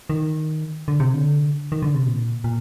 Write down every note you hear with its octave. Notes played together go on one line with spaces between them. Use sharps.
D#3
D3
C3
D3
D#3
D3
C3
A#2
A#2